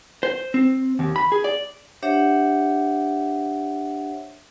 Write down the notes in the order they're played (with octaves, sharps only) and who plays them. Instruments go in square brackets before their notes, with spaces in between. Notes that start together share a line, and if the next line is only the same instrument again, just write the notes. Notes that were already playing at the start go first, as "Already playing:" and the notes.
[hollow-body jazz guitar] C5
C4
D#2
B5
G#4
D5
[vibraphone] D4 G4 C5 C#5 E5 F#5